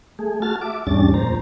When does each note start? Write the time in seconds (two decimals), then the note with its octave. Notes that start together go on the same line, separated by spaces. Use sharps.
0.19 A3 G#4
0.42 F#4 A5 F6 A6
0.61 E5 D6
0.87 E2 G#2 G3 C#4 D4 A6
1.14 F2 A#2 C5 A#5